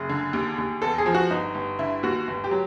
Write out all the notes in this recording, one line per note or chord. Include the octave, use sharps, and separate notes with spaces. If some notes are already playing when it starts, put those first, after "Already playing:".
Already playing: F#1 G#4
D3
D#2
D#2
E2 A4
G#4
F3
F#4
G1 D#4
G1
D3 E4
D#2 F#4
G1
G4
F#3